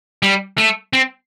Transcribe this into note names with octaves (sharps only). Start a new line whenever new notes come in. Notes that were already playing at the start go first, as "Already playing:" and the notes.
G3
A3
C4